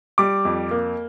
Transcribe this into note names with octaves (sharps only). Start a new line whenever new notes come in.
G3 D6
F2
A#3